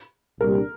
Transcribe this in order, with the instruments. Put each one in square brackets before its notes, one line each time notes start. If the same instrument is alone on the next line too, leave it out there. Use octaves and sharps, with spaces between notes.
[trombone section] C2 A#2 G3 D4 G4 [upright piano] A#4